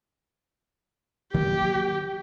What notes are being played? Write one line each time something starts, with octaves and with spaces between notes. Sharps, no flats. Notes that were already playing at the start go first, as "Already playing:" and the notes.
D#3 F#3 A#3 G4